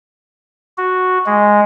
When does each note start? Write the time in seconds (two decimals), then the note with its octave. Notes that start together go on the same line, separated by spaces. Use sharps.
0.78 F#4
1.26 G#3